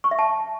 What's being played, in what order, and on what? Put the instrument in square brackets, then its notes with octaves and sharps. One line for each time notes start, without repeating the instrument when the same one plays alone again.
[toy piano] C#6
E5
A5